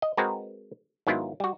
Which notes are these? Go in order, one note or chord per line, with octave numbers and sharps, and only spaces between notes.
D#5
G#3 C4 F#4 G#4 A#4 B4
G#2 D#3 F#3 B3 E4 F4
G3 F#4